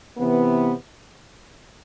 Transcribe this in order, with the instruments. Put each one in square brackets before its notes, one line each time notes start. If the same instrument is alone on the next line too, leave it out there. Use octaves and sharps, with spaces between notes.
[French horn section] C3 E3 B3